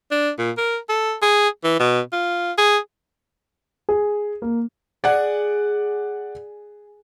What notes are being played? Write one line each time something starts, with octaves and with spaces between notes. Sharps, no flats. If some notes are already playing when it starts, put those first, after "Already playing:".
D4
A#2
A#4
A4
G#4
E3
B2
F4
G#4
G#4
A#3
G#4 D5 F#5